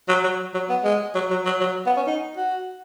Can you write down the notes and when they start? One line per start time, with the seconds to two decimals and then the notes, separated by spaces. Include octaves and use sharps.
0.09 F#3
0.24 F#3
0.54 F#3
0.69 B3
0.84 G#3
1.15 F#3
1.31 F#3
1.46 F#3
1.61 F#3
1.86 B3
1.97 C#4
2.07 D#4
2.37 F#4